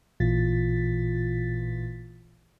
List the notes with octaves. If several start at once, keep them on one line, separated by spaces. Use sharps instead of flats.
A1 A#2 E3 F4 A6 B6